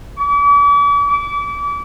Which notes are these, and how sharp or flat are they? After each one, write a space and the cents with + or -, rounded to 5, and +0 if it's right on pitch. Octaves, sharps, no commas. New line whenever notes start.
D6 -45
D6 -35